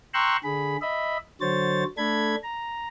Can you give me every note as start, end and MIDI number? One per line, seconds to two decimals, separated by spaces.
0.14 0.37 79
0.14 0.37 82
0.14 0.37 84
0.14 0.37 85
0.14 0.37 88
0.14 0.37 90
0.44 0.77 50
0.44 0.77 68
0.44 0.77 83
0.82 1.18 75
0.82 1.18 76
0.82 1.18 83
1.41 1.84 50
1.41 1.84 54
1.41 1.84 72
1.41 1.84 73
1.41 1.84 93
1.97 2.36 57
1.97 2.36 62
1.97 2.36 69
1.97 2.36 83
1.97 2.36 92
2.43 2.88 82